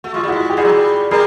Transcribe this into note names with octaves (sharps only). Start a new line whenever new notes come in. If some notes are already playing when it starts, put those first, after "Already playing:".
A3 F#4
G#3 F4
G3
G#3 E4 F#4
G4
G3 F#4 G#4
F#3
G3
G3 G#4 A#4